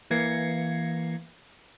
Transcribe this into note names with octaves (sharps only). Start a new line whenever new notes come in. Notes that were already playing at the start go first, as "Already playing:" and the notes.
E3 A#3 G#6 A#6 C7 C#7